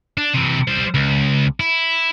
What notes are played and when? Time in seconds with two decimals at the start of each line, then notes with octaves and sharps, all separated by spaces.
0.18 D4
0.34 C3 E3
0.68 G3 C5
0.94 C#2
1.60 E4